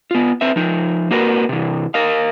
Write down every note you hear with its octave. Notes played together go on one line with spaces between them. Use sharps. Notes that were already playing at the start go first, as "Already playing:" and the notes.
B3 F4
C4 B4 E5
F3 D#4
A#3 F#4 A#4 B4
C3 E3
A#4 D#5 F5